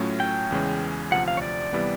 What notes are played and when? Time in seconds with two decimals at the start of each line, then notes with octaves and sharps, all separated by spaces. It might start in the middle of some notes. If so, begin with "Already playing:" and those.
Already playing: A2 F#3 A3 C#4 F4
0.20 G5
0.51 E2 C#3 E3 G#3 C#4
1.11 D2 C3 F3 F#5
1.28 F5
1.37 C#5
1.42 D5
1.73 C3 E3 G3 B3